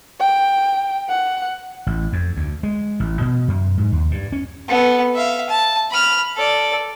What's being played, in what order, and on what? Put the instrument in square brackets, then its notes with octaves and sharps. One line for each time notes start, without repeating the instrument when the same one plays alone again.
[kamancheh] G5
F#5
[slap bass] A1
F2
D2
G#3
A1
B2
F#2
G#2
D#2
G2
C#4
[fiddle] B3 A4
E5 F5
A5
B5 F6
A4 D5